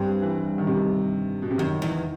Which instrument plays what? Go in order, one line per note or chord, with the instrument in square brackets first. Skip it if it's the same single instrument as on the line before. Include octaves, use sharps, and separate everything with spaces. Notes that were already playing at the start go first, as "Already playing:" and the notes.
Already playing: [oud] G2 [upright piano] C4
[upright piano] E3
D#3
C3
B2
C3
[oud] F#2 [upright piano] D#3
[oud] E2